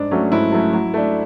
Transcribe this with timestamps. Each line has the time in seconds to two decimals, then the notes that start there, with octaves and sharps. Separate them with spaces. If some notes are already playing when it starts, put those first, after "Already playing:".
Already playing: G#2 D4
0.11 F#3 A3 C#4
0.32 G#2 E4
0.52 F#3 A3 C#4
0.73 F#3
0.94 A3 D4